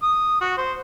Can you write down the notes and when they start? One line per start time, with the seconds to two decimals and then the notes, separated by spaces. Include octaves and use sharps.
0.03 D#6
0.41 F#4
0.58 C5